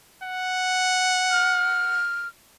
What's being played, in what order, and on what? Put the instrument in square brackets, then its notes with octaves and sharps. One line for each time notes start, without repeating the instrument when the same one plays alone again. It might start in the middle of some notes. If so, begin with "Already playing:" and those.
[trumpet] F#5
[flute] F6